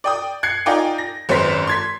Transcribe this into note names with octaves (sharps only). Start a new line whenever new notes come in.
D5 G5 D#6
F#6 G#6 C7 C#7
D#4 F4 D5 D#5 G5 G#5
A#6
G#1 F#2 C#4 B4 C5 B6
C6 G#6 B6